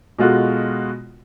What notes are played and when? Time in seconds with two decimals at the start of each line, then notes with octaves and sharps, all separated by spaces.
0.19 B2 G#3 F4 F#4 A4